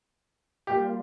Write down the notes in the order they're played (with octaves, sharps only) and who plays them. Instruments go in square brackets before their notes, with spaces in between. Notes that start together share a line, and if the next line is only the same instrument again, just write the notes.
[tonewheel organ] G3 A#3 F4 [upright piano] G4